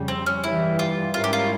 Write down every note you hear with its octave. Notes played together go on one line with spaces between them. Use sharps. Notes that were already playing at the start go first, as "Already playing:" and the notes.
Already playing: F2 C#3 G3
C4
C#4
G2 E3 G3 E4
F4
G#2 G3 C#4 E4 F4 A#4
G4
F4